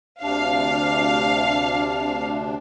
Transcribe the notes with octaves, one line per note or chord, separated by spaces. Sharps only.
D2 C3 D4 F5